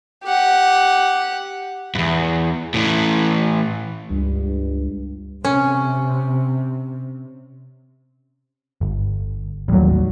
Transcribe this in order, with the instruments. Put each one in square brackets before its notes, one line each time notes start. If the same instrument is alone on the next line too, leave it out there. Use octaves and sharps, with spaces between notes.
[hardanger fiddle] G4 F#5
[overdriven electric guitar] E2 G2
A2 E3
[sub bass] C#2 [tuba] G2
[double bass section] C3 [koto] C#4
[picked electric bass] G1
[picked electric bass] A1 D#2 [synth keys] F#3 G3